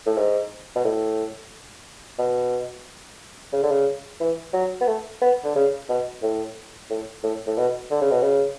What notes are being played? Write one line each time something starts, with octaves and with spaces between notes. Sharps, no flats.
A2
G#2
B2
A2
B2
C#3
D3
C#3
E3
F#3
B3
A3
B3
D3
C#3
B2
A2
A2
A2
A2
B2
D3
C#3
B2
C#3